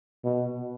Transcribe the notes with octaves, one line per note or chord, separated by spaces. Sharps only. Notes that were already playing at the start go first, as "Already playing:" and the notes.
B2